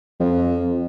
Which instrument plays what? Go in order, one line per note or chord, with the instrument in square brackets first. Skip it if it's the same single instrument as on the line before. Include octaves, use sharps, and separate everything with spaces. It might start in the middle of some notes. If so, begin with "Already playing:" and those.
[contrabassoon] F2